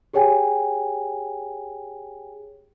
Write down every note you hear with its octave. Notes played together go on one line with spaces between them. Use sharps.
G4 G#4 C#5 G5 G#5